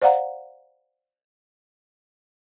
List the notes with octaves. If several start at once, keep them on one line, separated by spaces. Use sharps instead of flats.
C5 D5 F5 F#5 A#5